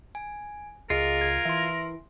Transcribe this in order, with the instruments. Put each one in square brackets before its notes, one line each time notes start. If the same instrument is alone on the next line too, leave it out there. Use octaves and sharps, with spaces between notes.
[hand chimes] G#5
[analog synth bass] C#2 [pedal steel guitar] F4 [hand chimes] G#4 D#5 [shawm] A#4
[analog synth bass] C#2 [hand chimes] G#6
[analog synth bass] E3 [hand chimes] E5 C6